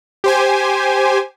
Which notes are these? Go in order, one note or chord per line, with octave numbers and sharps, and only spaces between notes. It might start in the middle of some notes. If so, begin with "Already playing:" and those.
G4 C5 G#5